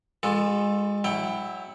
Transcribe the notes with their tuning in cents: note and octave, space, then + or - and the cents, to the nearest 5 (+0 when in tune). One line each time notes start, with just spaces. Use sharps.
G#3 -25 F4 +35 A4 +0
F#3 +0 E4 +0 G5 +20